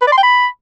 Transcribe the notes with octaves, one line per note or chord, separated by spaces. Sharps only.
B4
D5
C6
G5
B5